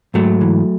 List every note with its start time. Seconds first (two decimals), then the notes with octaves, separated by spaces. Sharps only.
0.14 G#2 F#3 A3
0.41 E3